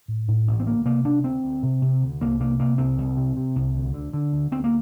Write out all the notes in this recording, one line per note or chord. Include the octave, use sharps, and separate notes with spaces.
A2
A2
A1
C4
D2 A#3
C3 A#3
C3 D4
D2 C4
D2
C3
C3
D2
C2 A#3
C3 A#3
C3 A#3
C2 C4
C2
C3
C3
C2
D2
D3
D3
D2
D2 C4
A#3